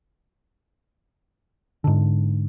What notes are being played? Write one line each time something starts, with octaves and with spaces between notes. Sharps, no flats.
G#2 D3